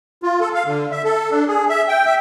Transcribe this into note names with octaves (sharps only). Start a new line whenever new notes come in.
F4
A4
F5
D3
E5
A4
D4
G#4
E5
G5
E5